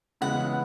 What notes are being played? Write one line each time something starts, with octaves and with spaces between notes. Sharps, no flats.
C#3 E3 G#3 B3 E4 F#5